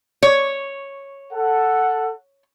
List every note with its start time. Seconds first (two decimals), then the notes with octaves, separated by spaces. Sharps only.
0.23 C#5
1.32 A4 F#5